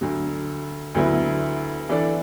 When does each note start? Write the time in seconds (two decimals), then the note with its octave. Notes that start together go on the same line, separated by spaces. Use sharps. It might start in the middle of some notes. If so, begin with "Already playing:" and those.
0.01 D2 D3 F#3
0.95 D2 D3 F#3 B3 E4
1.89 E3 D4 A4 D5